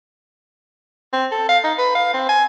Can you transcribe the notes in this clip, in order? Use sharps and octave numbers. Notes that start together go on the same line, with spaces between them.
C4
A4
F5
D#4
B4
F5
C4
G#5